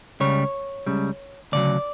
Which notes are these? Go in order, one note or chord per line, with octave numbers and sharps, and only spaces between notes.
C#2 C#3 G3 C#5
C#2 C#3 G3
D2 C#3 F#3 D5